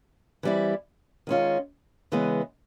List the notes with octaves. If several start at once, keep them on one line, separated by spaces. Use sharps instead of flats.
E3 G3 C4 E4
D#3 G#3 C#4 F4
C#3 E3 G#3 B3